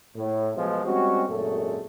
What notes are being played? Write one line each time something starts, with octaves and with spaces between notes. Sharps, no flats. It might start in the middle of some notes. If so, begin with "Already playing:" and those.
A2
B1 B2 F3 G#3
G3 G#3 C4 C#4 F#4
G#1 F#2 A#2 G#3 A3 A4